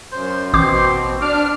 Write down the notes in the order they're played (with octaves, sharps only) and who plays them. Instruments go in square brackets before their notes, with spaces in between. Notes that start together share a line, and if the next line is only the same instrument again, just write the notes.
[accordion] F#2 [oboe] C5
[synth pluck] A1 D6 G6 [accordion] B2 C4 [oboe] C6
[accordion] D4 F6 [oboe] D6